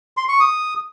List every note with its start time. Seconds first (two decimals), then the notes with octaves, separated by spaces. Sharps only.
0.17 C6
0.29 C#6
0.40 D#6